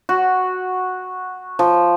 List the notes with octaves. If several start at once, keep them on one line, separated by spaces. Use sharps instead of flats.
F#4
F3